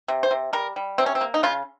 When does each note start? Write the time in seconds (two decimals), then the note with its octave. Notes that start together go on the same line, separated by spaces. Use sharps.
0.08 C3
0.23 C5
0.31 C3
0.53 G3 A#4
0.76 G3
0.98 C3 C4
1.06 C#4
1.15 C4
1.21 A#3
1.34 D#4
1.43 C#3 F4